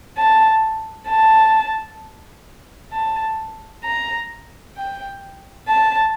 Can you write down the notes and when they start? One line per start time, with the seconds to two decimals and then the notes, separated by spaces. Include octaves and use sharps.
0.17 A5
1.09 A5
2.92 A5
3.84 A#5
4.77 G5
5.68 A5